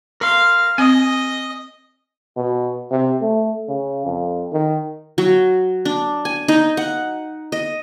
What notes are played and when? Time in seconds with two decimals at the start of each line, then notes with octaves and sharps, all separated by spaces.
0.21 A#4 F5 C6
0.78 C4 D#5 G#5 D#6
2.36 B2
2.91 C3
3.21 A3
3.68 C#3
4.05 F2
4.53 D#3
5.18 F#3
5.85 D4
6.25 G#5
6.48 D#4
6.77 F#5
7.52 D#5